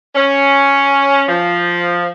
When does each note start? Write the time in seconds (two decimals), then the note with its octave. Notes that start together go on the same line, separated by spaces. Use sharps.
0.16 C#4
1.29 F3